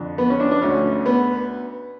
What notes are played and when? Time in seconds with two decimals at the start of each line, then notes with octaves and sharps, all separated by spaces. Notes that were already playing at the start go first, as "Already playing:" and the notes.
Already playing: F2 D3
0.18 B3
0.30 C#4
0.40 D4
0.51 D4
0.62 D2 D3 C#4
1.06 B3